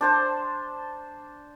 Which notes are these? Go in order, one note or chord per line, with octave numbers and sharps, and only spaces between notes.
D4 C5 A5